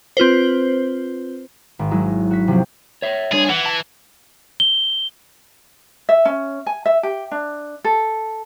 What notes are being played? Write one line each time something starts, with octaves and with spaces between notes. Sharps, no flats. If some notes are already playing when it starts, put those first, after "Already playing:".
C4 F4 B4 C5
G#1
F#3 G#3 D#4 E4
F#4 B6
C3 F3 F#3 C4
C#5 E5
G3 D4 G#4 C#5
E3 F#5
A5
G7
E5
C#4
G#5
E5
G4
D4
A4